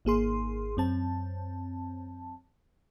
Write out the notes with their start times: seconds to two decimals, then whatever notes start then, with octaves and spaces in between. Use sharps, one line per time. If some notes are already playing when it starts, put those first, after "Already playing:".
0.05 G#1 A#3 G#4 C6
0.77 F#2 C4 A5